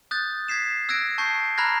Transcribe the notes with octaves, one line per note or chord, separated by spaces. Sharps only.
D#6 F#6 G6 A6
G#6 B6 C7 E7
E6 F#6 G#6 A#6 D7
A5 C#6 G6 C7
A#5 B5 F6 F#6 G#6 A#6